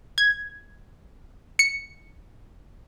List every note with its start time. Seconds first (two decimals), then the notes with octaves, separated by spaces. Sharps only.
0.18 G#6
1.59 C#7